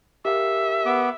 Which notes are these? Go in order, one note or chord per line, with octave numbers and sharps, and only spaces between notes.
G4 A#4 E5 F5
B3 D6